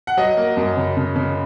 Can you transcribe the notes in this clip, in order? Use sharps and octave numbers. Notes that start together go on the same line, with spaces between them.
F#5
F#3 D#5
A#3
F#2
C#3
C#3
C#3